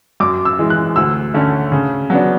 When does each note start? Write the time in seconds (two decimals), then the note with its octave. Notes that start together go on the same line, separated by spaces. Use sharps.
0.20 F#2 D6
0.45 E6
0.59 E3 G#3
0.70 F#6
0.96 D2 E6
1.34 D3 A3 C#4
1.72 C#3
2.10 F#3 B3 D4